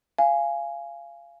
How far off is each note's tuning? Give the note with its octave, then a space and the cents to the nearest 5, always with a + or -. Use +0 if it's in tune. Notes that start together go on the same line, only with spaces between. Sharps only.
F5 -20 G#5 +0